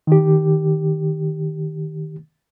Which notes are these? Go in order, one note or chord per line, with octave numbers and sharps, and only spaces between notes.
D#3 G4